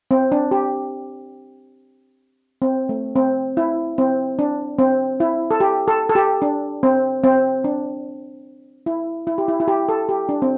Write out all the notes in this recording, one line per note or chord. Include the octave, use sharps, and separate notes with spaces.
C4
D4
G4
C4
A3
C4
E4
C4
D4
C4
E4
A4
G4
A4
A4
G4
D4
C4
C4
D4
E4
E4
G4
E4
E4
G4
A4
G4
D4
C4